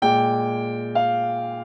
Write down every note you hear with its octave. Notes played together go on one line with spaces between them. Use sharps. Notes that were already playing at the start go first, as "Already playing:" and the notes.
A#2 G#3 G5
F5